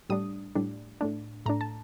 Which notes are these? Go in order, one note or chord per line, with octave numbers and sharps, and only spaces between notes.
A2 G3 D4 D#6
A2 G3 D4
A2 A3 D4
A2 A3 D4 A#5
A5